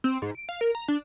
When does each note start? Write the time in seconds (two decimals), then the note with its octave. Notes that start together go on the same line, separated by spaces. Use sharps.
0.04 C4
0.22 G#2
0.35 D7
0.49 F5
0.61 A#4
0.75 A#5
0.88 D4